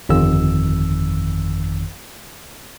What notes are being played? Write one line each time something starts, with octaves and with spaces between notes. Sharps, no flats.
G1 F2 D#3 E6